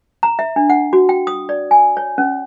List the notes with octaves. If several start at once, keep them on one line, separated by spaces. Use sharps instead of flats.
A#5
E5
D4
F#5
F#4
G5
D#6
D5
G#5
C#5
C#4